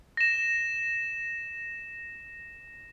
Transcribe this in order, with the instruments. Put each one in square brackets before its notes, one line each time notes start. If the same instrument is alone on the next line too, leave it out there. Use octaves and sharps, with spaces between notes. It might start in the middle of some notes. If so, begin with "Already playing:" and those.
[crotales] A#6 E7